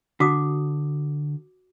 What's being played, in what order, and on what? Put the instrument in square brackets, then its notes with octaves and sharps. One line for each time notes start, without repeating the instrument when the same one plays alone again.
[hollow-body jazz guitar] D3 [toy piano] F#4 D6 D#6